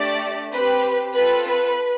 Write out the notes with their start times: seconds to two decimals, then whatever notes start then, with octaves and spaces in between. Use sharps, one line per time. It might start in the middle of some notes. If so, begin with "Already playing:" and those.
Already playing: A3 D4 G4 D5
0.51 C4 G4 B4
1.14 C4 F4 A4 B4
1.46 B4